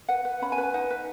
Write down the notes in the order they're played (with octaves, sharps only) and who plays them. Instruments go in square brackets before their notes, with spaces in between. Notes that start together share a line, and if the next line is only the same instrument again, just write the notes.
[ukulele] B4 F#5
B4
C#4 B5
G#5
B4
G#5
D#4 F#5
B4